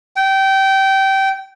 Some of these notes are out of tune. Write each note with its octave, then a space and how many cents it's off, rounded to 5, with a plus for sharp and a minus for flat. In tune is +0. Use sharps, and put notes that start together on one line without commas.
G5 -20